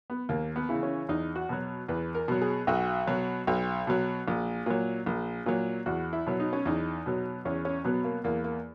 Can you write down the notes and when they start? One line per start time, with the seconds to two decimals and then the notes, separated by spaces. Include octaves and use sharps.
0.10 B3
0.29 D#2 A#3
0.56 B3
0.69 C#3 E3
0.83 C#4
1.09 E2 D#4
1.36 F#4
1.49 B2 F#3
1.88 E2 B4
2.15 A#4
2.28 B2 F#3
2.42 G#4
2.67 B1 F#4
3.07 B2 F#3
3.47 B1
3.87 B2 F#3
4.28 A#1
4.66 A#2 F#3
5.06 A#1
5.46 A#2 F#3
5.86 E2 F#4
6.13 E4
6.26 B2 F#3
6.40 D#4
6.53 C#4
6.65 E2 D#4
7.06 B2 F#3
7.45 E2 C#4
7.65 C#4
7.84 B2 F#3 B3
8.04 A#3
8.24 E2 A#3
8.44 A#3